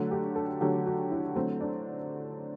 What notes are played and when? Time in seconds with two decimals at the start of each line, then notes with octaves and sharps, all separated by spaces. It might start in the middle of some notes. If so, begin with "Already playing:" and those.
Already playing: D3 F#3 A3
0.11 G4
0.35 A4
0.61 D3 F#3 A3 G4
0.86 F#4
1.11 E4
1.35 D3 F#3 A3 C4
1.60 D4